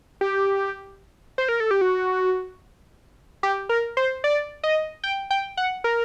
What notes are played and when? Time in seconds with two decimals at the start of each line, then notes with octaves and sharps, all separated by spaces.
0.21 G4
1.38 C5
1.49 A#4
1.60 A4
1.71 G4
1.81 F#4
3.43 G4
3.69 A#4
3.97 C5
4.24 D5
4.63 D#5
5.04 G5
5.30 G5
5.57 F#5
5.84 A#4